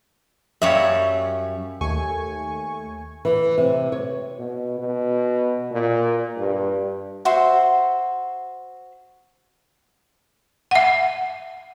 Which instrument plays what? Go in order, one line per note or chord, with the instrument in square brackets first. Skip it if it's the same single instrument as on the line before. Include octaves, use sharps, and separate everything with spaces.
[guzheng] F#2 G3 C#5 [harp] E5 F5
[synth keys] D#2 A3 G#5 C#6
[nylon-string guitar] E3
C3
C#5
[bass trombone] B2
B2
A#2
G2
[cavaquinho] F#4 C5 E5 C6
[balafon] E5 F#5